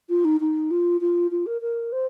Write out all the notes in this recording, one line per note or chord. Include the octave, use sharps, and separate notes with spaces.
F4
D#4
D#4
F4
F4
F4
A#4
A#4
C5